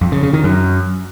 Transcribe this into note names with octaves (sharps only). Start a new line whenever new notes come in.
F2
C#3
C#3
D#3
F#2